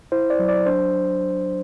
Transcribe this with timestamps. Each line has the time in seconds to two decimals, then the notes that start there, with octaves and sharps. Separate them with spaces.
0.12 E4 C5
0.30 D5
0.39 F#3
0.49 D5
0.66 D4 C5